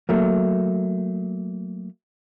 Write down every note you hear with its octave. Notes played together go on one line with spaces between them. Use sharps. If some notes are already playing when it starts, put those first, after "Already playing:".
F#3 A3 A#3